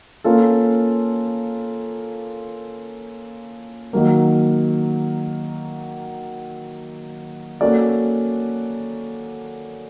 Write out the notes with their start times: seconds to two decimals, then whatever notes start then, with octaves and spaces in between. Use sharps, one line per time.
0.24 A#3 C#4 F4 A4
3.93 D#3 F#3 A#3
7.61 A#3 C#4 F#4 A4 D5